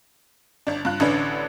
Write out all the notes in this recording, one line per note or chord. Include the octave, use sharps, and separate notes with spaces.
G1 D4
G2 F4 F#6
A1 D3 C#4 D4 B4